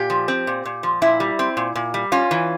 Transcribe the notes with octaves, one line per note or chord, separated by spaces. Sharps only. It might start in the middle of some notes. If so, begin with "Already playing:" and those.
Already playing: A#2 G4
F3
C4
A#2
A#2
F3
A#2 E4
G3
C4
A#2
A#2
G3
C#4 F4
E3